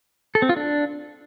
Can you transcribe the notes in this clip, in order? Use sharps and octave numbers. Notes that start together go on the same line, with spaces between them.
A4
C4
F4
D4